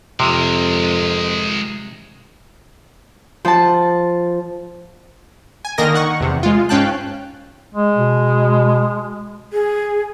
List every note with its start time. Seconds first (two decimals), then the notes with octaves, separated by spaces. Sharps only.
0.20 F2 C3 G#3 A#4
3.45 F3 A5
5.65 G#5
5.78 D3 D#3 A#3 A#4 D#5 A#6
5.94 D#3 F#5 C#6
6.20 E2 C3
6.43 G#3 F4
6.69 G#2 C#4 F5 G5 A5 F#6
7.74 G#3
7.96 B2
9.53 G#4